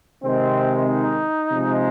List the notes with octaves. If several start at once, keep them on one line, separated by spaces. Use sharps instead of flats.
C3 D#3 G#3 C4
D#4
C3 F3 G#3